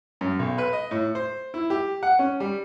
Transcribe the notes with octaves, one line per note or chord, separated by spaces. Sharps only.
F#2
B1
B4
D#5
A2
C5
E4
G4
F#5
C#4
G3